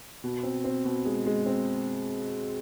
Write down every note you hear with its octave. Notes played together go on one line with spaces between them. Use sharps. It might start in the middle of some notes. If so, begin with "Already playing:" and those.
B2
C4
C4
B2
G#3
G#3
C4